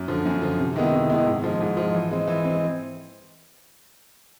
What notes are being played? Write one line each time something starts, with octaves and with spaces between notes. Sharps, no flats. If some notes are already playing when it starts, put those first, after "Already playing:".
Already playing: F#2
D3 F3
F#2
D3 F3
C3
D#3 G#3 B3 E4
C3
D#3 G#3 B3 E4
G#2
F3 G#3
G#2
F3 G#3
E3
G#3 C4
E3
C4
G#3